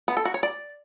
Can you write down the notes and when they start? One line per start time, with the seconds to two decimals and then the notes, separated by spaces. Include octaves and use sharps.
0.08 B3
0.17 A4
0.25 F#4
0.34 C#5
0.43 D5